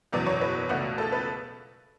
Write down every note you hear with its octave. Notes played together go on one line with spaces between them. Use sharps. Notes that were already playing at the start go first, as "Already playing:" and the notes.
F#1 E2 B2 F#3 D5
C#5
B4
C#2 B2 A3 D4 F#4
A4
B4